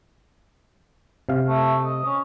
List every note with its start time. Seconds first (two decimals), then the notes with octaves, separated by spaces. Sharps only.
1.29 C3 F5
1.48 A3
1.85 D#5
2.05 C#4